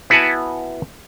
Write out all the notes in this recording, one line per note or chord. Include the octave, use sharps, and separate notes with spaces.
B3 E4 F#4 F#5 G#5 A5